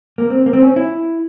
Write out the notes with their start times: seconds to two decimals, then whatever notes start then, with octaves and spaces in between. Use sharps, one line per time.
0.18 A#3
0.30 C4
0.46 A#3
0.53 C4
0.61 C#4
0.76 E4